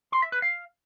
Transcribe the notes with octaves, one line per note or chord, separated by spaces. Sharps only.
C6
E5
B4
F5